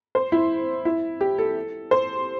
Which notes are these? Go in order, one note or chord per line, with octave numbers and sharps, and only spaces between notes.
C5
E4
E4
G4
A4
C5